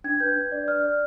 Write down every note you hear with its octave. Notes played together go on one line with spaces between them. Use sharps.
D4 G#6
B4 G6
D4
D5
D5 F6
D5